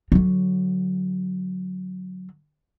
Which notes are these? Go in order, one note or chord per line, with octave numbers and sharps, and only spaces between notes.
D3 F#3